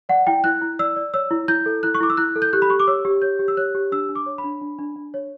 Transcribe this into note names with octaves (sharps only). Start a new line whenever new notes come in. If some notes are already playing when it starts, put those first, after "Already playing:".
D5 F#5
E4 G5
E4 F#6
E4
D5 E6
D5
C#5 E6
E4
E4 G6
A4
E4 F#6
C#6
E4 D6
E6
E4 F#6
A4
G6
G4 F#6
B5
G4 C#6
D6
C#5 E6
G4
C#5 G6
G4
E6
C#5 F#6
G4
D4 E6
D4
D6
C#5
B5
D4
D4
D4
D4
C#5